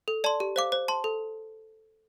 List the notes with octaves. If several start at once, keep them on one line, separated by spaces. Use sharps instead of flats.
A4
D5 A5 C6
G4
C5 F5 D6
C5
A5 C6
A4